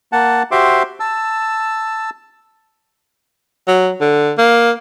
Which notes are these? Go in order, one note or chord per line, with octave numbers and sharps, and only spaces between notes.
A#3 F#5 A5
F#4 G4 C5 E5 C6 D6
A5 E6
F#3
D3
A#3